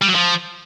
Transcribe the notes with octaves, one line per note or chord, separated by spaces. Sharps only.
G3
F#3
F3